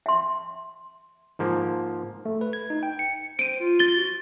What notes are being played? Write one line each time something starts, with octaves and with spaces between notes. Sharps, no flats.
E5 C6
G#2 F3 A#3
A3
B4
G#6
D#4
G5
C#7
C5 D7 D#7
F4
A6 G7
F#4